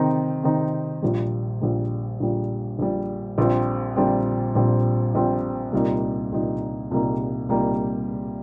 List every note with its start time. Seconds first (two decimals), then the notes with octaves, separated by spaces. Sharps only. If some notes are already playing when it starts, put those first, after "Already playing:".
Already playing: C3 D#3 C4 D#4
0.44 C3 D#3 C4 D#4
1.02 A#1 A#2 G3
1.61 A#1 A#2 G3
2.20 A#1 A#2 G3
2.79 A#1 A#2 G3
3.38 A#1 A#2 G3 C4
3.96 A#1 A#2 G3 C4
4.55 A#1 A#2 G3 C4
5.15 A#1 A#2 G3 C4
5.72 C2 A#2 G3 A#3 D#4
6.32 C2 A#2 G3 A#3 D#4
6.91 C2 A#2 G3 A#3 D#4
7.49 C2 A#2 G3 A#3 D#4